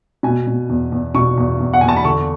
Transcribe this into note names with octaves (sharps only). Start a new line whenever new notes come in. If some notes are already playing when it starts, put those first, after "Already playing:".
B2 G#5
B2
E2
E2
B2 C#6
E2
E2
F#5
E2 G#5
A5
B5
D3 C#6